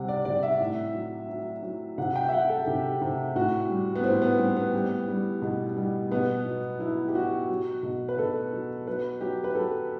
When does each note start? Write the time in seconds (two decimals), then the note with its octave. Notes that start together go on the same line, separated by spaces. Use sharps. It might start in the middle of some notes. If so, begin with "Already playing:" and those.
Already playing: C3 G3 F#5
0.08 D5
0.25 C3 D5
0.43 E5
0.60 A2
0.94 F#3
1.30 F#3
1.63 F#3
1.98 C3 F#5
2.16 G5
2.28 E5
2.32 F#3 F#5
2.49 A4
2.67 C3 G4
3.01 C3
3.35 A2 F#4
3.70 G3
3.95 B3
4.04 A2 C4
4.22 B3
4.38 G3 C4
4.57 B3
4.74 G3
5.08 G3
5.42 B2
5.77 G3
6.12 B2 B3
6.45 F#3
6.80 F#3 E4
7.08 G4
7.14 F#3 F#4
7.49 F#3
7.83 B2
8.08 B4
8.18 B2 A4
8.53 F#3
8.87 F#3 B4
9.21 F#3 G4
9.44 B4
9.55 F#3 A4